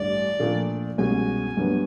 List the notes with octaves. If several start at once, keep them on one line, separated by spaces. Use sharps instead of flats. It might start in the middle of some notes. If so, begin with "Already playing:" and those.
Already playing: A1 G2 D3 D5
A#2 F3 A3 D4
C2 B2 G#3 C#4 G#5
G2 D3 F#3 B3